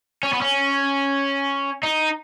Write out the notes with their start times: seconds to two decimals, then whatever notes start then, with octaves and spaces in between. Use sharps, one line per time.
0.23 C#4
0.33 B3
0.42 C#4
1.83 D#4